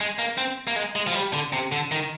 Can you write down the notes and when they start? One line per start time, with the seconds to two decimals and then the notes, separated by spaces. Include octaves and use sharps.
0.01 G#3
0.19 A#3
0.38 C4
0.67 A#3
0.76 G#3
0.96 G#3
1.07 F3
1.15 G3
1.33 D3
1.53 C3
1.72 D3
1.92 D#3